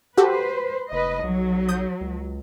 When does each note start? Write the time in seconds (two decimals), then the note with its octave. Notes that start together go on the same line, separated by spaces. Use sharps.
0.17 F#4 G4 A4 B4 C5
0.92 F1 B4 D#5
1.23 B1 F#3
1.69 D#6 G6
2.01 C#2